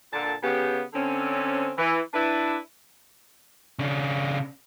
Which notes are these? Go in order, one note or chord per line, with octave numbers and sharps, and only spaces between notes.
A#2 D3 A5
C#3 B3 G4
D3 C4 C#4
E3
D4 E4 B4
C#3 D4